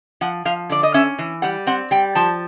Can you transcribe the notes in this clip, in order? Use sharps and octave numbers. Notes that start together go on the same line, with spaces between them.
F3 F#5
F3 F5
D3 D5
D#5
C#4 E5
E3
G3 F#5
C4 F#5
G3 G5
F3 A5